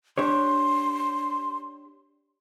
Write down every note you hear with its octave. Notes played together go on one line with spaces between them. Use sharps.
D4 G4 C#5 C6